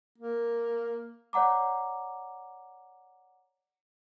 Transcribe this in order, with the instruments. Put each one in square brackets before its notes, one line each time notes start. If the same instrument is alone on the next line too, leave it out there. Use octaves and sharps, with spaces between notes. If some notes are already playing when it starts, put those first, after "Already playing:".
[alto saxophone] A#3
[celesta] C#5 D5 F#5 A#5 D6